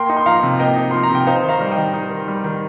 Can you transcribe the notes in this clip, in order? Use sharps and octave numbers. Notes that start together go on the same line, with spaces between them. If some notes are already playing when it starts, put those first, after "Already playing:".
Already playing: A#3 G5 C6
D#4
C6
F3 F5 A#5
C3
A#3 D#5 G5
D#4
F3 C6
A#5
C3 G5
D#4 C5 F5
D#3
F5 A#5
G3
D#5 G5
D#3
D#4
D#3
G3
D#3